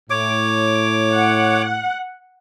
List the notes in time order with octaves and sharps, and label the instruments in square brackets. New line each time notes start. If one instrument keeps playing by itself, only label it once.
[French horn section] A2 [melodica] C#5 D6
[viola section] F#5